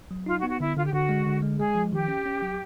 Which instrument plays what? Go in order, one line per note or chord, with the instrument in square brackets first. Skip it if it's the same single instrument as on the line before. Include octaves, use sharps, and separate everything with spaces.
[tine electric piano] F#3
[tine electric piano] D#4 [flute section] F4
[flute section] F#4
[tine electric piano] B3
[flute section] F#4
[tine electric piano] D3 [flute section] E4
[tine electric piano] D3 [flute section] F4
[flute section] G4
[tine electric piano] D3 [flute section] F#4
[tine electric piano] G#3
D3
G#3
[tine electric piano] G#3 [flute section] G#4
[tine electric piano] F3
[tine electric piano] D#3 [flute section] G4
[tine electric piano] C#4
C#4
F#3